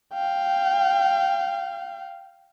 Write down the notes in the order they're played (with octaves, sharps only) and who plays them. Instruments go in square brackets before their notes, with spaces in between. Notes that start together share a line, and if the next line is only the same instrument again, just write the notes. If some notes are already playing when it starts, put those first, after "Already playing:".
[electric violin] F5 G5